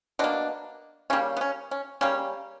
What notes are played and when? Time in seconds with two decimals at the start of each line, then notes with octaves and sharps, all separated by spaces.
0.19 B2 A#3 D4
1.10 C#3 G3 A#3 C#4
1.37 B3
1.41 C#4
1.71 C#4
2.01 C#3 G3 A#3 C#4